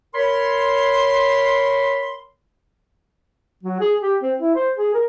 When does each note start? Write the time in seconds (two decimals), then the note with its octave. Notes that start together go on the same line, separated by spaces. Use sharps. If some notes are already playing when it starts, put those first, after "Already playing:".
0.14 A#4 C#5 B5 C6
3.63 F#3
3.80 G#4
4.02 G4
4.22 C4
4.40 E4
4.55 C5
4.78 G#4
4.94 A#4